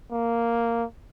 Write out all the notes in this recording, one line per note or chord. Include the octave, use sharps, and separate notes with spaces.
A#3